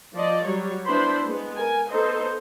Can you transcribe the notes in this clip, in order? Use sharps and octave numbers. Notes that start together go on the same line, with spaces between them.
F3 D5 D#5
F#3 G3 C#5
B3 D4 E4 C5 B5 C6
G#3 B3
A#4 G#5
B3 D#4 A4 C5 D#5